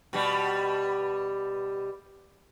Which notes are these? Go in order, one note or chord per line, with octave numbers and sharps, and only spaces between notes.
B2 G3